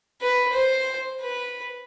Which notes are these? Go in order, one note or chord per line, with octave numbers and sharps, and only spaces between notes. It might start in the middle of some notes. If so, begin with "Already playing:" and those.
B4
C5
B4